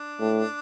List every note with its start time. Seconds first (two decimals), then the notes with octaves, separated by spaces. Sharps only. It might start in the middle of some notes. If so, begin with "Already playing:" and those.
Already playing: D4
0.20 A2